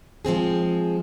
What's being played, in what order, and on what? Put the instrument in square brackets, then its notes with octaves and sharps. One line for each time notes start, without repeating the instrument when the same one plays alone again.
[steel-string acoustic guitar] F3 G#3 C4 G#4